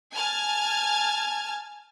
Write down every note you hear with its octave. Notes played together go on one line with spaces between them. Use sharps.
G#5 A5 F6 G#6